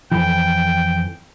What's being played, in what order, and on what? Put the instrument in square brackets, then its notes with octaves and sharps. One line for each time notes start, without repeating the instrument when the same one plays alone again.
[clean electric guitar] F2 E3 [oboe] G5